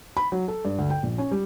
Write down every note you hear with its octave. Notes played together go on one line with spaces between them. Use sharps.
B5
F#3
A4
G2
D2
G5
A#1
C#4
G3